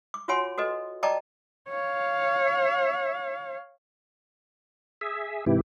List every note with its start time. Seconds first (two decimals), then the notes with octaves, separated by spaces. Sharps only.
0.14 D6
0.28 F4 F#4 C#5 F#5 G#5 C6
0.58 F#4 A4 B4 D#5
1.03 D5 D#5 G5 A5 A#5 D6
1.69 C#5 F5
5.01 G#4 E5
5.46 G#2 C3 E3 E4 G4